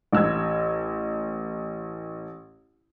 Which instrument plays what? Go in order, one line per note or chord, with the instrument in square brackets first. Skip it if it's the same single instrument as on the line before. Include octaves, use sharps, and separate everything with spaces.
[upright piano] A1 E6 G#6